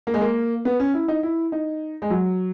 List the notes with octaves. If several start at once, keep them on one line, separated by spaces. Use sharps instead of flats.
A#3
G#3
A#3
B3
C#4
E4
D#4
E4
D#4
G#3
F#3